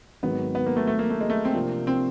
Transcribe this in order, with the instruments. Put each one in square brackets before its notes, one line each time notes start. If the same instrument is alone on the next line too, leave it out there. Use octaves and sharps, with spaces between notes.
[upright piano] G#1 G#2 D#3 F#3 [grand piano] B3
[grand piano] B3
A#3
A3
A3
A#3
A3
G#3
A3
C4
[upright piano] C3 F3 A#3 D4
[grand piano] C4